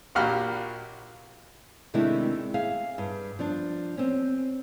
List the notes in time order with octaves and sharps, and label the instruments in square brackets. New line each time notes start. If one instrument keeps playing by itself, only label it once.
[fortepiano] A#1 A#2 F#4 G4 B5 F6
[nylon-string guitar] C3 D#3 G#3 A3 D4 E4
G#4 E5 F5
G2
F3 D4
C4 C#4